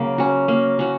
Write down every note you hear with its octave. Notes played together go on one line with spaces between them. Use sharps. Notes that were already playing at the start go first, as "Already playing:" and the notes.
Already playing: C#3 F#3 A#3
C#4 F#4
A#3
C#4 F#4